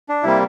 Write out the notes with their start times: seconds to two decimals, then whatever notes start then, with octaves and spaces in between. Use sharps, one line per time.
0.09 D4
0.23 C3 G3 A#3 E4